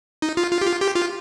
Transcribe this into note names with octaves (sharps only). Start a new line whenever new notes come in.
D#4
F4
F4
G4
F4
G4
F4